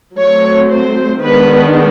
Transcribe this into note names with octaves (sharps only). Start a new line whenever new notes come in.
F#3 A3 C4 C#5
C5
D#3 G#3 B3 D4 B4